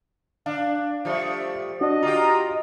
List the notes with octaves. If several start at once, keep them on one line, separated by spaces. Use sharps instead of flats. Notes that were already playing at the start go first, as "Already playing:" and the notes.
D4 F5
F3 G3 A3
D4 F#4 D#5
F4 G4 A#5
D#5